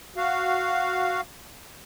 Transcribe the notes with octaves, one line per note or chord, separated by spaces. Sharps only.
F#4 F5